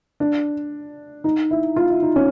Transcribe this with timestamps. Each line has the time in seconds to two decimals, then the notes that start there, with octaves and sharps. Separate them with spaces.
0.20 D4
1.24 D#4
1.51 E4
1.76 F4
1.90 E4
2.02 D#4
2.16 C#4